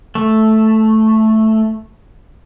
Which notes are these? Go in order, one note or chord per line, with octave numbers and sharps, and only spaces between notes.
A3